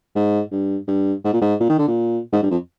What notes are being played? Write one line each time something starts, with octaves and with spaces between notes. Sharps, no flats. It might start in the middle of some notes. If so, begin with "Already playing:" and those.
G#2
G2
G2
G#2
A#2
G#2
A#2
D#3
D3
A#2
G#2
G2
F2